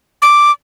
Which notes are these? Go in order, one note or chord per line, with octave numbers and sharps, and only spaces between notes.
D6